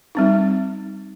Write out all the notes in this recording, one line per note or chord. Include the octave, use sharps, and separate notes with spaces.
G3 C4 D#4